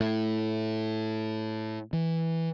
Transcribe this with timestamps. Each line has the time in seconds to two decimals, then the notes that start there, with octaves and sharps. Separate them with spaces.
0.01 A2
1.93 E3